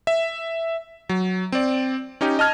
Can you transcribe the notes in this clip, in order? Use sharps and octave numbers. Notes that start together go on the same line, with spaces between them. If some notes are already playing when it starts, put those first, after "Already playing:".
E5
F#3
C4 D5
C#4 D#4 G4
D#5 A5 F6 G#6